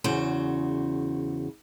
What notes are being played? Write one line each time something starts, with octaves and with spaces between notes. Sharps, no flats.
E2 C#3 F#4 C5